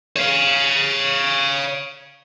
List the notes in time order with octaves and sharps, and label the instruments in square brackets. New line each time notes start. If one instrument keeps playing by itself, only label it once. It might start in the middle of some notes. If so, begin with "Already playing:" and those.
[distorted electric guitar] C#5 F5